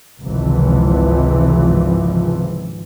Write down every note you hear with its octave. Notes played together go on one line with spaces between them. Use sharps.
G#1 C#2 C3 E3 F3